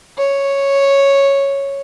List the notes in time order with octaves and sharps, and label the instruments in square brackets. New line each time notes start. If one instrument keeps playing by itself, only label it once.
[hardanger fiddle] C#5